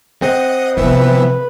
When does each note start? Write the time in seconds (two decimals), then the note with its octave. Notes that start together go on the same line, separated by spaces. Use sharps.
0.22 C4 D#5 F#5 D#6
0.77 C3 E3 F3 B3 B4 E5